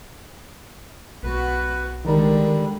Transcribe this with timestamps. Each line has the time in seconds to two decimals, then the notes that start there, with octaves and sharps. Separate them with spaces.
1.23 B1 B3 F#4 B4
2.05 D3 D#3 G3 G#3 A#4